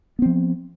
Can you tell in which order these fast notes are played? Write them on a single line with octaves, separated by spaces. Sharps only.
B3 C4 F3